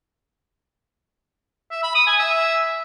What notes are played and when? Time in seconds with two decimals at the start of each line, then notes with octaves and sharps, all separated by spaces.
1.71 E5
1.83 B5
1.95 D#6
2.07 G#5
2.19 E5